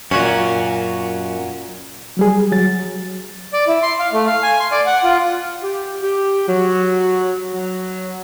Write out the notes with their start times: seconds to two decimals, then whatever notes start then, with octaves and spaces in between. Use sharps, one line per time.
0.11 F#2 A#2 C#4 F#4
2.17 F#3 G3 G#4
2.52 F#3 A6
3.53 D5
3.67 E4
3.83 C6
3.99 F5
4.13 A3
4.27 F5
4.43 G#5
4.60 C6
4.72 D5
4.86 F#5
5.04 F4
5.63 G4
6.03 G4
6.48 F#3
7.53 F#3